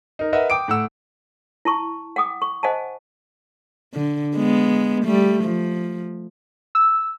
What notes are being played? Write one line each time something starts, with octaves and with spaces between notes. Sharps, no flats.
D#4 A#4
A#4 B4 D#5 E5 F#5
G5 D6 D#6 D7
A2 F#5 E6
E4 A5 C#6
F#5 G5 D6 D#6
C#6
C5 D#5 F#5 G#5 A5
D3
G#3 B3
G3 A3
F3
E6